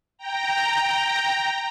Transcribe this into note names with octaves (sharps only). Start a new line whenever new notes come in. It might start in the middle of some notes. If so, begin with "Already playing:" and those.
G5 A#5